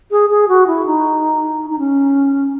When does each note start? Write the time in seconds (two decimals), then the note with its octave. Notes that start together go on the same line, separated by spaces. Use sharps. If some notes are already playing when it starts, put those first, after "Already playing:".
0.11 G#4
0.30 G#4
0.48 F#4
0.67 E4
0.86 D#4
1.70 D#4
1.79 C#4